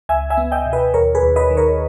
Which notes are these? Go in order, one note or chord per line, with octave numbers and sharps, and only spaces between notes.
C#2 E5 G#5
E5 G#5
B3
D#5 G5
B2
B4 D#5
D#2 A#4 C#5
G#4 B4
D#2
B4 D#5
D#3
A#4 C#5